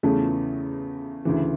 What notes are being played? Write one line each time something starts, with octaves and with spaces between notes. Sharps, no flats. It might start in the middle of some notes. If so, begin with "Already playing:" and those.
E2 C#3 E3 A3 C#4
D2 C#3 E3